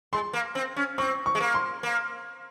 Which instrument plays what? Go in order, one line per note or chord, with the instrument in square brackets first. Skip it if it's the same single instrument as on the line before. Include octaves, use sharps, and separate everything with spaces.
[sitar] G#3 [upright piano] C6
[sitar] A#3
C4
C#4
[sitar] C4 [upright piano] C#6
[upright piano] C#6
[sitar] G#3
A#3
[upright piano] C6
[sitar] A#3